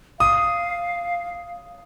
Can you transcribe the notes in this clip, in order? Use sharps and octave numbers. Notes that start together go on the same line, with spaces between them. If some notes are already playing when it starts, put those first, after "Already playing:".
F5 D#6